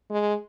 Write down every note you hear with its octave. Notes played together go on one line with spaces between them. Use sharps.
G#3